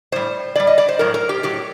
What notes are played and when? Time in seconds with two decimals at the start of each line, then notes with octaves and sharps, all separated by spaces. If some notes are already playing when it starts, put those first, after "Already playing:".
0.12 A2 G3 C5
0.56 A2 G3 D5
0.67 D#5
0.78 D5
0.89 C5
0.99 A2 F#3 A#4
1.14 A#4
1.29 G4
1.43 A2 F#3 G4